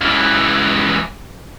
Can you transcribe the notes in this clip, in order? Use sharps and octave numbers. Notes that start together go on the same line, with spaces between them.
C#2 E3